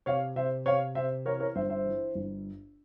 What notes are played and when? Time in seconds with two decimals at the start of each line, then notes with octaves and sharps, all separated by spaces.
0.06 C3 C#5 F5
0.36 C3 C5 E5
0.66 C3 C#5 F5
0.95 C3 C5 E5
1.26 E3 A#4 C#5
1.40 A#4 C#5
1.55 G1 C5 E5
1.70 C5 E5
1.86 E3
2.15 G1